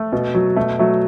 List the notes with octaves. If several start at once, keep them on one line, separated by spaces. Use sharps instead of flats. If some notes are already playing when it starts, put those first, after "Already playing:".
Already playing: A3
B2
F#3
B2 A3
F#3 A3